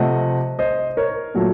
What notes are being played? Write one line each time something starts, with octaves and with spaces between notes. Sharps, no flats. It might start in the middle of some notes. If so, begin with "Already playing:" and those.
Already playing: C3 F3 A3 D#5 F#5
C5 D#5
A#4 C#5
A#2 F#3 A3